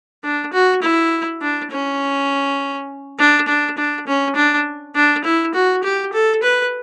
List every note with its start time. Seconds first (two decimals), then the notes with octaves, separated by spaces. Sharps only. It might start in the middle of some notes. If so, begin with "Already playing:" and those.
0.24 D4
0.53 F#4
0.83 E4
1.41 D4
1.71 C#4
3.19 D4
3.48 D4
3.78 D4
4.07 C#4
4.36 D4
4.95 D4
5.24 E4
5.54 F#4
5.84 G4
6.13 A4
6.43 B4